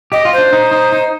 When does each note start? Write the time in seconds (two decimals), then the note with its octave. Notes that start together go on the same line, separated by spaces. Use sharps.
0.12 G4 D#5
0.25 F4
0.33 C5
0.38 D4
0.53 D#4
0.71 D#4
0.92 D#4